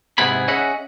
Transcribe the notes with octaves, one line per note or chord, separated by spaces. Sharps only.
G#2 C3 B3 E4 G#4 B5
C#4 G#4 D#5 E5 F#5